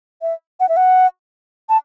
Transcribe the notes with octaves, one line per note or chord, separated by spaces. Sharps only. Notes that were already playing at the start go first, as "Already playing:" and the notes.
E5
F#5
E5
F#5
A5